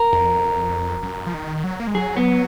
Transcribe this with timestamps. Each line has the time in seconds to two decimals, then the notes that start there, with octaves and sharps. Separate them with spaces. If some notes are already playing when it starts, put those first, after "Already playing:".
Already playing: A#4
0.12 F2
1.03 F#2
1.27 F3
1.34 D#3
1.64 F#3
1.80 A#3
1.87 G#3
1.94 F#3 G#4
2.17 B3